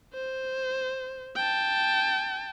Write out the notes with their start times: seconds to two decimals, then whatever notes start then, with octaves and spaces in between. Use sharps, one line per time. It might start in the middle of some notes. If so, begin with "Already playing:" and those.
0.14 C5
1.36 G5 A5